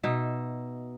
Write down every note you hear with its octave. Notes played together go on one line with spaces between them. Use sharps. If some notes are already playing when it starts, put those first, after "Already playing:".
B2 D#4 E5